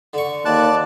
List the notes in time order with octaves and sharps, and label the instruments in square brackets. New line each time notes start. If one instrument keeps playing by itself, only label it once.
[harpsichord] D3 C#6
[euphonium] D#2 [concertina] D5 A5 F#6